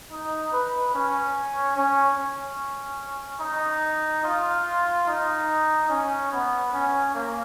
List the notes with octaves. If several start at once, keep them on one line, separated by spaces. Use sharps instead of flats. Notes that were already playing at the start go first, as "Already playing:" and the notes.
D#4
B4
C#4
C#4
C#4
D#4
F4
D#4
C#4
B3
C#4
A#3